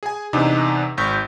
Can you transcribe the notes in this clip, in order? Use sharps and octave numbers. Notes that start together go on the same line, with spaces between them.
G#4 G#5
E2 C3 D4 D#4
G#1 C#6 G6 B6